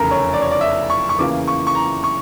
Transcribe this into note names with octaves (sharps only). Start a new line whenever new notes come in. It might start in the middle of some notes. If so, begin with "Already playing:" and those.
Already playing: F1 E2 C#3 A4 A#4
C#5
D5
C#5
D5
E5
C#6
C#6
E2 C#3 E3 A#3 D6
C#6
C#6
A#5
C#6